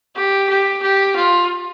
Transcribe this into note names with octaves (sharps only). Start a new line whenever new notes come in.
G4
G4
G4
F4